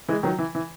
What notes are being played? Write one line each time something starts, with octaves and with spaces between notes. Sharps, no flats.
E3 G#3
D#3 F#3
E3
E3